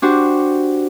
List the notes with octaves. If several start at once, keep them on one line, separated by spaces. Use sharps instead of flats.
D4 F#4 G4 C5